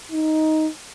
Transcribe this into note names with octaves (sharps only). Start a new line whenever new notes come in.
D#4